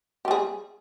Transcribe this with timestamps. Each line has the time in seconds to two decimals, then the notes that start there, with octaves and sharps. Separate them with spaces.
0.25 G4
0.28 G3
0.31 G#4